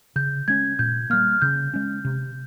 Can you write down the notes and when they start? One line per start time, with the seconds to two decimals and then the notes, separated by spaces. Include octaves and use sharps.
0.16 C#3 G6
0.48 G#3 C#4 G#6
0.79 A#2 G6
1.10 G3 A#3 F6
1.42 C#3 G6
1.74 G#3 C#4
2.05 C3